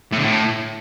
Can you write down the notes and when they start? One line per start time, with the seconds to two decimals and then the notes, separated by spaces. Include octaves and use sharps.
0.12 A2
0.18 D3
0.24 A2